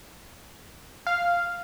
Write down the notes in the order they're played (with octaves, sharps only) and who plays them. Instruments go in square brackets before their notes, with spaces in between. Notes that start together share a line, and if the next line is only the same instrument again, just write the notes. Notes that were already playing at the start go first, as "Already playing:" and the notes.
[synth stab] F5